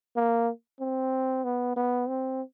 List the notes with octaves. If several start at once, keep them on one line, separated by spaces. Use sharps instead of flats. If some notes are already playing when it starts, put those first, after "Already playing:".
A#3
C4
B3
B3
C4